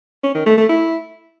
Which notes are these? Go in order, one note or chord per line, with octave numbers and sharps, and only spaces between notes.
C#4
D#3
A3
A3
E4